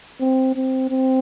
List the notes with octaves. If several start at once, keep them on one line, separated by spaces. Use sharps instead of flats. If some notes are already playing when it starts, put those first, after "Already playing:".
C4
C4
C4